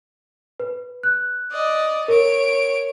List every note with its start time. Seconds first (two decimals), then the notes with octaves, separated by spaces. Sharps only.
0.60 B4
1.03 F#6
1.52 D5 D#5
2.08 A#4 C#5 D7